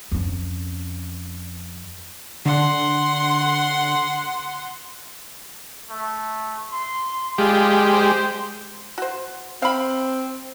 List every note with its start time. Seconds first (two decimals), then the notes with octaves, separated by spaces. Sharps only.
0.12 F2 C#4
2.45 D3 F#5 C6
5.90 A3
6.72 C6
7.38 G#3 F4 G4
7.92 C5
8.98 F#4 C5
9.62 C4 F5 B5